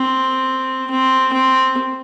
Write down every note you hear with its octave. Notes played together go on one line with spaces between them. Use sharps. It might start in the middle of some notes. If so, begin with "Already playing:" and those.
Already playing: C4
C4
C4